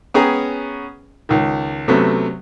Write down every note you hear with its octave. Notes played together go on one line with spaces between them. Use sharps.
B3 C#4 G#4 G5 A#5
C#2 D#3
C3 F#3 A3 B3 C#4